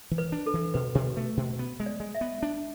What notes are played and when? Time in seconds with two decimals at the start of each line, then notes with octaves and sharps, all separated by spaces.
0.11 E3
0.18 B4
0.32 D4
0.46 A4
0.54 E3
0.74 B2 B4
0.95 B2
1.17 A3
1.37 B2
1.59 B3
1.80 G#3
1.86 D5
2.00 G#3
2.15 E5
2.21 B3
2.43 D4